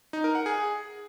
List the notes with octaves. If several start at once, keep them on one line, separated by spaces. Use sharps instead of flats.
D#4
A#4
F#5
G#4